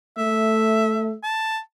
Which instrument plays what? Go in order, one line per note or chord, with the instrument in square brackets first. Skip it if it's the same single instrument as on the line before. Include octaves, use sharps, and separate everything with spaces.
[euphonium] A3 [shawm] E5
[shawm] A5